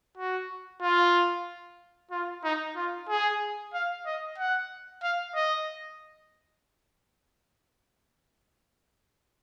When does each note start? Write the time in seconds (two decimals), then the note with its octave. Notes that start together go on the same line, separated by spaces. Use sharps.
0.17 F#4
0.82 F4
2.11 F4
2.44 D#4
2.76 F4
3.09 G#4
3.73 F5
4.06 D#5
4.38 F#5
5.03 F5
5.35 D#5